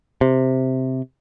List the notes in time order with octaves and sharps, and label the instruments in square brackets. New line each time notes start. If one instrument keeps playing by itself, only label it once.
[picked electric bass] C3